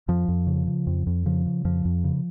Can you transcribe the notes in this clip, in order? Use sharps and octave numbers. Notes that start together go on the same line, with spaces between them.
F2 F3
F2
C#3
C#3
F2
F2
C#3 F3
C#3
F2 F3
F2
C#3